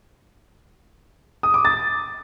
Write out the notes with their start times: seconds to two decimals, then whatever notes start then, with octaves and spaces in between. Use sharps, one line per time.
1.43 D#6
1.54 D6
1.65 A6